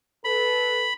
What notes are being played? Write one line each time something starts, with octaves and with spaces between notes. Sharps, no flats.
A4 B4 B5